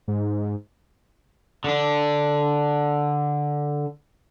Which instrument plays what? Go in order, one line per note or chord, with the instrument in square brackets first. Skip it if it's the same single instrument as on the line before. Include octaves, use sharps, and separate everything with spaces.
[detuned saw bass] G#2
[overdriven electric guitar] D3 D4